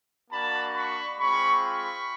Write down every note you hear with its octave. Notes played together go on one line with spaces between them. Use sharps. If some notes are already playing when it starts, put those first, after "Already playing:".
A#3 D4 F#4 A5 B5
B5 C#6
G#3 C4 F4 B5 C#6
B5 C#6